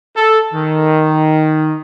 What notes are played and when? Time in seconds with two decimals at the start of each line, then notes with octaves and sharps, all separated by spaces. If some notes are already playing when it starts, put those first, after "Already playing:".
0.17 A4
0.53 D#3